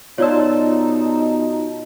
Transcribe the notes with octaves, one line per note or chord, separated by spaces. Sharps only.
B2 D#4 F4 C#5 D5 A5 E6